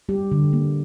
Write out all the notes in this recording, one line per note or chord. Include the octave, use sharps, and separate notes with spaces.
G3 G4
D3
A#3